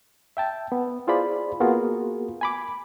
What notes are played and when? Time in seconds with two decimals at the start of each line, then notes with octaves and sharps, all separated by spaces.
0.37 E5 G5 A5
0.72 B3
1.07 E4 F4 G#4 C5 D5 B5
1.61 A#3 B3 F4 F#4 G#4 A#4
2.41 G#5 B5 D6